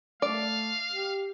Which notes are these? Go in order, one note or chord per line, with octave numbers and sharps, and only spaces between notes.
A3 D5 F5
G4